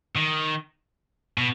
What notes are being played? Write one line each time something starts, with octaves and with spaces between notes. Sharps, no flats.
D#3
B2